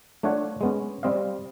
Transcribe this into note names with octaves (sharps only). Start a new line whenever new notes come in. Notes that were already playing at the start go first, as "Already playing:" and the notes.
A3 D4 F4 C#5 F#5
G#3 B3 C#4
G3 C4 D#5 F5